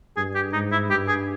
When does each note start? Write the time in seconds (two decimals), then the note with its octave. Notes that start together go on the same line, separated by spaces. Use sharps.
0.17 G2 G#4
0.35 G4
0.53 G#2 D#4
0.72 E4
0.90 G2 G4
1.08 G#4